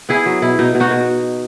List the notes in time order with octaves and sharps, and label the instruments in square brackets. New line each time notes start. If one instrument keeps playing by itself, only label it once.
[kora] B3 E4 G#4
F#3
B2 E4
B2 D#4
B2
D#4 F#4
B2